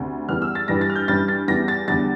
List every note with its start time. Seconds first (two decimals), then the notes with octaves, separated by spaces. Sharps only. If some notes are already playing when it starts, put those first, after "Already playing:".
Already playing: D2 C3
0.28 E2 E3 G3 F6
0.42 E6
0.55 A6
0.68 G2 E3 G3 A#6
0.81 A6
0.90 F6
0.95 G6
1.08 G2 E3 G3 A6
1.28 A6
1.48 E2 E3 G3 A#6
1.68 A6
1.88 E2 D3 G3 A6